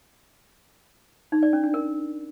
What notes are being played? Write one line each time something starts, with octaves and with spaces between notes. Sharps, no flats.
D#4
D5
C#4
D4
A#4